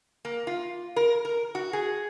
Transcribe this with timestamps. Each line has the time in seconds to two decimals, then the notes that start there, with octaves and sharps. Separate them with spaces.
0.25 A#3
0.47 F4
0.96 A#4
1.25 A#4
1.55 F#4
1.73 G#4